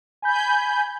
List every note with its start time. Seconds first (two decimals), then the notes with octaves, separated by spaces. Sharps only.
0.22 G#5 B5 G6